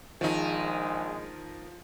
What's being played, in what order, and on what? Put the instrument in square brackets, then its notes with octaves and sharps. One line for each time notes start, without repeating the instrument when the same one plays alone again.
[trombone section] A#1 G#3 [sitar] D#3 D#4 [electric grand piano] F3